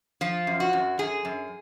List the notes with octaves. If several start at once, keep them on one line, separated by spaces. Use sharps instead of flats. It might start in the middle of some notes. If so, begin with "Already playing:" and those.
F3 F4
F#2
F#4
F#2
F#2 G#4
F#2